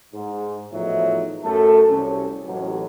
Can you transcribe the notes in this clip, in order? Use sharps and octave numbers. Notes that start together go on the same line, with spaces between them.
G#2
E2 A2 F3 F#3 D#4 E5
F#2 A3 A4 A5
C2 C#4
A1 D#2 F#3